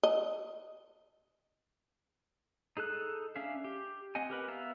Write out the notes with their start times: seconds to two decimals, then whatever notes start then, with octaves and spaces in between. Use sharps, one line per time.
0.03 D#5
2.77 D#4 G#4 A4 F#6
3.36 C#4 D4 E5 F5
3.64 G4
4.15 C4 D#5 F#5 G#5
4.30 G4 A#4 B4
4.48 B3 E5 F5 A#5